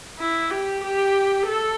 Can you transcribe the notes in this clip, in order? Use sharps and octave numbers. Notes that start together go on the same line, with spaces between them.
E4
G4
G4
A4